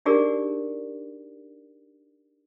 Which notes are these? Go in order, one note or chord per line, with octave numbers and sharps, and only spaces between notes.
D4 D#4 G4 G#4 A#4 D5